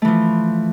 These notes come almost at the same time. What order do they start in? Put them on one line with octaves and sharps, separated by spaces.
A3 E3 F3